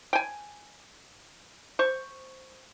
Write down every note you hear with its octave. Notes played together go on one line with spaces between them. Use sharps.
G5 G#5
C5 C#6